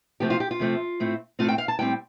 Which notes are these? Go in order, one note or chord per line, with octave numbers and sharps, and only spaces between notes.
C3 F3 A3 C4 G4
F4
G4
F4
C3 F3 A3 C4
A2 A3 C4
A2 A3 C4 F4
G5
F5
A5
A2 G3 C4 G5